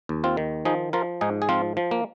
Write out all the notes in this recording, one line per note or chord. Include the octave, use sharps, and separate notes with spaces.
D#2
C4 F4
D#3
F3 D#4 G#4
F3 F4 A#4
G#2 D#4 G#4
G#4
F3 C4 F4
F3
A#3